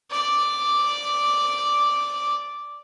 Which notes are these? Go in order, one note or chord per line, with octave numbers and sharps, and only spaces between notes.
D5 D6